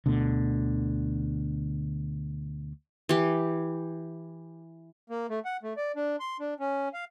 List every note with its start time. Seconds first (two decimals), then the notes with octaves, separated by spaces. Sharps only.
0.06 D2 B2 D3
3.09 E3 G4
5.10 A#3
5.30 A3
5.45 F#5
5.63 A3
5.77 D5
5.96 D4
6.20 C6
6.40 D4
6.60 C#4
6.94 F5